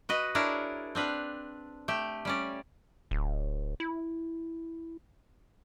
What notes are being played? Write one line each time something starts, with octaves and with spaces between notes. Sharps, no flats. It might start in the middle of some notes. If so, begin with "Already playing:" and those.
F#4 B4 D#5
D4 E4 G#4 A#4 C#5 D5
C4 D4 B4 F5
A3 G4
G3 C#4 D5
D1
E4